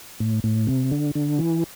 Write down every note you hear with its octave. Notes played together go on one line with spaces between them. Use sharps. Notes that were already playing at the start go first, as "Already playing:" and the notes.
A2
A2
C3
D3
D3
E3